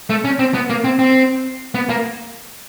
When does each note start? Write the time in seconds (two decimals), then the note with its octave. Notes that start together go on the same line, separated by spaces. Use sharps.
0.10 A3
0.25 C#4
0.39 C4
0.54 B3
0.70 A#3
0.84 C4
0.99 C4
1.75 B3
1.89 A#3